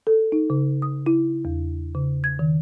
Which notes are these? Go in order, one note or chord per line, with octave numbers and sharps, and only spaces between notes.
A4
D#4
C#3
D#6
E4
E2
C#3
G#6
D#3